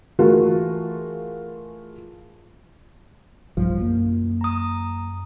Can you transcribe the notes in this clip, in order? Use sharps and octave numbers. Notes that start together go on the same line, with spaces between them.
E3 A3 F4 F#4 G#4 A#4
B1 G2 F3
F#2 A#3
A#5 D#6